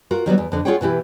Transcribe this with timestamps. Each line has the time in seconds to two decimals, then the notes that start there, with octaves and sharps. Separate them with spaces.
0.11 F4 F#4 A#4
0.26 D#3 F#3 G3 B3
0.38 E2
0.52 F2 D3
0.65 F4 G#4 C#5 F#5 G5
0.81 B2 E3 E4 G4